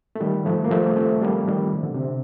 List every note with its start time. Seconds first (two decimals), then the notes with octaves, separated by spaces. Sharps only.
0.16 A3
0.20 D#3 G3
0.45 F3 A3
0.64 A#3
0.71 F3 A3
0.96 A3 C4
1.21 G3 A#3
1.48 D#3 G3
1.73 C3
1.83 D3
1.94 C3